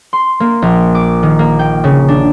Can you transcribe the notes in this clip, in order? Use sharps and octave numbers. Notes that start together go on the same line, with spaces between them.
C6
A#3
A#1
D6
D#3
A#3
G5
C#3
D4